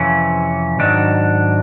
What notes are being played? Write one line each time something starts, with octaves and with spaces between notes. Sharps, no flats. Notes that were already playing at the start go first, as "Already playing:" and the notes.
Already playing: F2 C3 E3 C#4
G#2 D#3 F#3 D4